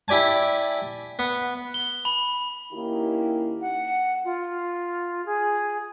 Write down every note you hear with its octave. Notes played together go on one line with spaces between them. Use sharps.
E4 G4 D5 G#5 A5
B3
G7
B5
D#3 A#3 C#4 D#4 E4 G4
F#5
F4
G#4